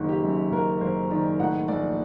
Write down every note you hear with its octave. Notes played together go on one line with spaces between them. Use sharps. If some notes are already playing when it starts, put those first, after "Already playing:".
Already playing: F#1 D#3
G4
F#2
F#1 A#4
F#1 C5
D#3 D5
A2 F#5
A#1 D5